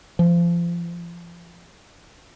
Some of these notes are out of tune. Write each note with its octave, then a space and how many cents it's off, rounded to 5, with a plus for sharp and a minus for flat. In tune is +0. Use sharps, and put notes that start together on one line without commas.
F3 -30